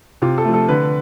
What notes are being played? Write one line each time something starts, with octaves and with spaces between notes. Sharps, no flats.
C3 F4
A4
F3 A3
A4
D3 B4